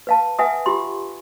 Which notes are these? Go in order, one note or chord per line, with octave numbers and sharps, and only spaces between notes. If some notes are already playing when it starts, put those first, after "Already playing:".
B4 F5 A5
B4 E5 F#5 G#5 D#6
F4 G4 C6